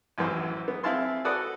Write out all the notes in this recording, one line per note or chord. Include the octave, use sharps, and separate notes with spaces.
A1 F#2 E3 C5
B3
C4 E4 G#4 F5 A5 C6
F#4 A4 B4 D5 F#5 D#6